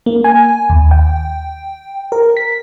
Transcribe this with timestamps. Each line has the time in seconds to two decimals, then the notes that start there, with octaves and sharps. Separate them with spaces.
0.06 A#3
0.24 G#5
0.70 D#2
0.91 G5
2.12 A#4
2.37 B6